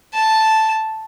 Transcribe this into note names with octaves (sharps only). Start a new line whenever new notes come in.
A5